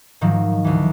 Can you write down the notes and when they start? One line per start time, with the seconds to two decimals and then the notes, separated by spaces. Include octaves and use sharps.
0.21 G#2 D#3 F3 F#3
0.64 D2 E3